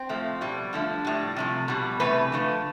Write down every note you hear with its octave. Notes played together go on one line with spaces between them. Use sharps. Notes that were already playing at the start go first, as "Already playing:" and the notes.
Already playing: C4
A2 F3 A3
B2 G3
D3 F3 A3
A2 G3
C3 F3 A3
B2 G3
C3 E3 A3 B4
D3 F3 A3